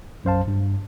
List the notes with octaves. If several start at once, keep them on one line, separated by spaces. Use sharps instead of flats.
B1 F#2 C5 F5 A5
G2